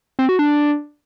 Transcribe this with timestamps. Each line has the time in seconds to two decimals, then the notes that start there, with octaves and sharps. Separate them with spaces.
0.19 C4
0.29 F#4
0.39 D4